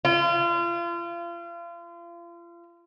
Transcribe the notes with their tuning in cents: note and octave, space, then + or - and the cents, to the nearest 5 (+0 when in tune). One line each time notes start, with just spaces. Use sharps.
F4 -35